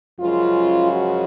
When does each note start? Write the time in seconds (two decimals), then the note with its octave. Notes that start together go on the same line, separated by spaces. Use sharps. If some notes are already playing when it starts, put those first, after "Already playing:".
0.19 F#2 C#3 F3 G#3 C#4 F4
0.91 F#4